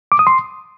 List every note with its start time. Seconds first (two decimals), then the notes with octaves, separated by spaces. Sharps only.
0.12 D6
0.19 D#6
0.27 C6